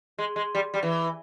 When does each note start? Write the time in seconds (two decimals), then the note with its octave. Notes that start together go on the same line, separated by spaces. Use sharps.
0.19 G#3
0.36 G#3
0.55 G3
0.74 G3
0.83 E3